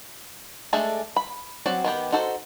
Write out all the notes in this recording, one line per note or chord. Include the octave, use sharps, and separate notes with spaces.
G#3 A3 D4 G#4 A4
B5
F#3 C4 F#4 D5
D#3 B3 G4
D#4 F#4 A4 C5